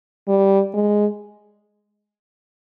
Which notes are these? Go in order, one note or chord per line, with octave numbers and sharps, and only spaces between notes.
G3
G#3